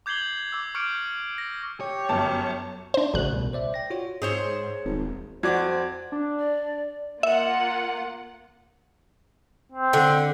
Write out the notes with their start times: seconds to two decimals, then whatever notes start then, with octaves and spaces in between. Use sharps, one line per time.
0.06 D6 G6 G#6 C7 F#7 G7
0.52 D6 E6
0.75 C#6 D6 F6 G6 C#7 D7
1.38 A#6
1.81 G4 C#5
2.09 G1 F#2 A5
2.94 D4 C5
3.14 A1 C#3 F#4 F#6
3.33 C2 B2
3.53 C5 D5 E5
3.74 G5 A#6
3.90 F4 F#4 C#5
4.22 G#2 G#4 C5 C#5
4.85 D#1 G#1
5.43 F2 F#4 C5 D5 F#5 D6 G#6
6.12 D4
6.38 D5
7.23 A#3 F4 E5 F#5
9.72 C4
9.93 D3